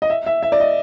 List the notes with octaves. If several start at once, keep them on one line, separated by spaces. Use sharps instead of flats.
D#5
E5
E5
E5
D5
D#5